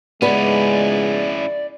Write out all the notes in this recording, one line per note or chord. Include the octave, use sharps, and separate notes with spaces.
C#2 G#2 G#3 B3 C#4 E4 B4 D5